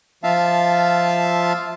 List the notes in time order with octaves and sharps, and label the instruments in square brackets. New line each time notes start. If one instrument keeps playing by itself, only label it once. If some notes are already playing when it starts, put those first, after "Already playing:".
[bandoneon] F3 F4 E5 F5 A5